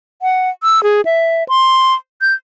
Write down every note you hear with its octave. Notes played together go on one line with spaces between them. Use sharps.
F#5
E6
G#4
E5
C6
G6